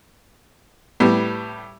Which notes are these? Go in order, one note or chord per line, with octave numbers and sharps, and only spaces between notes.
A2 G3 B3